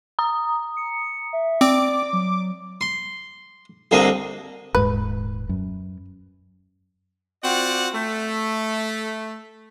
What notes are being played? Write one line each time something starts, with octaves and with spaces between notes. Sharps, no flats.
A#5 D#6
C#7
E5
C4 D5 D6
F#3
C6
C2 D3 A#3 C4 D#5
D#1 G#2 B4
F#2
C4 F4 F#4 D5 F#5
A3